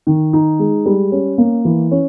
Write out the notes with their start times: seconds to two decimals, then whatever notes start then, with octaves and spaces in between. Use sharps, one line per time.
0.07 D#3
0.33 D#4
0.59 G#3
0.86 G3
1.12 C#4
1.38 A#3
1.65 E3
1.91 C#4